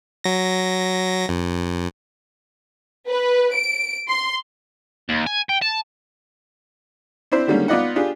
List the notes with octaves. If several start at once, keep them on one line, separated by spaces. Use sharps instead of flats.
F#3 A#6
F2
B4
D7
C6
D#2
G#5
G5
A5
C4 D4 E4 C5
D3 D#3 G3 G#3 A#3 C#4
B3 D#4 F4 D5 D#5 F#5
D4 F4 G4 G#4